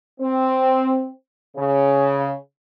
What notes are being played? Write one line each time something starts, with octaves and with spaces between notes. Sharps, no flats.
C4
C#3